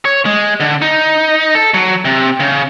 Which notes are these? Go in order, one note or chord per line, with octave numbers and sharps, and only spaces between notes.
C#5
G#3
D3
D#4
A4
F#3
C3
C#3